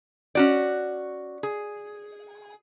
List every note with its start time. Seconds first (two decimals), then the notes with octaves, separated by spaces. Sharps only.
0.35 C#4 F#4 D5
1.43 G#4